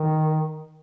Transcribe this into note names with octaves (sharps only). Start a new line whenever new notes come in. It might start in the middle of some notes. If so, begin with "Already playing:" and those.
Already playing: D#3